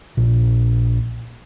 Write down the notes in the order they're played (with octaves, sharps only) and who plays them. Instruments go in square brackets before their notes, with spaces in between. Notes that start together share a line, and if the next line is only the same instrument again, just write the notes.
[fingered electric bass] A#1